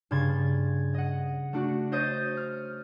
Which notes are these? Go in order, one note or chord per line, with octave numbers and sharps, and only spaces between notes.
G2 C#3 C6 G#6 A6
D#5 F#5
A3 D4 F#4
C5 C#5 D#5 D#6 G6 A6
F6